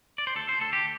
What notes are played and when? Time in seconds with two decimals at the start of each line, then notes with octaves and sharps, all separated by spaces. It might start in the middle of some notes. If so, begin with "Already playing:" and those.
0.18 D5
0.27 C5
0.36 D2 A4
0.49 C5
0.61 D2 A4
0.73 G4